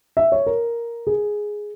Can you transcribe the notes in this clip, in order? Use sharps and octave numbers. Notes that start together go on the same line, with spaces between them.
E5
C#5
A#4
G#4